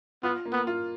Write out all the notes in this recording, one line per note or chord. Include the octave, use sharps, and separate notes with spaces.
B3 F4
A#3
B3
F4